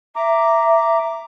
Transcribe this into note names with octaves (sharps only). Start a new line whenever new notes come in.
E5 A#5 D6